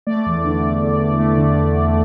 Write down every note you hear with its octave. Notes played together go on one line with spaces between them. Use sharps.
A3 D5
E2
D3
D3
E2
E2
A3
D3